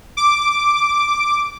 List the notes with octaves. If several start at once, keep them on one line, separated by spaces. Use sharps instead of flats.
D6